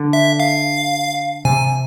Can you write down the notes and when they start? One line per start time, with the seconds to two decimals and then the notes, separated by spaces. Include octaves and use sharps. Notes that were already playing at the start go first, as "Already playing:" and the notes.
Already playing: D3
0.13 E5
0.40 F5
1.45 C3 G#5